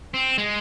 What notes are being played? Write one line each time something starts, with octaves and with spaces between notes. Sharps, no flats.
C4
G#3